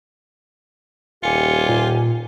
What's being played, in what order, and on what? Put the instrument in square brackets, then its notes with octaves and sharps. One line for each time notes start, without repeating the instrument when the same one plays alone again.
[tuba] D#1 [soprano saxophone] F4 [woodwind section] G4 G#5 [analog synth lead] C#7
[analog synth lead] A#2